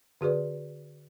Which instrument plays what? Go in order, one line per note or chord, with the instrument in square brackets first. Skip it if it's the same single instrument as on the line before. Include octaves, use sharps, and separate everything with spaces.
[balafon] D3 F#4 G#4 B4 D5